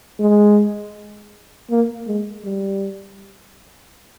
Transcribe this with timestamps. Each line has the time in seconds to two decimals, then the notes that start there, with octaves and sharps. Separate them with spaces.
0.19 G#3
1.70 A#3
2.07 G#3
2.44 G3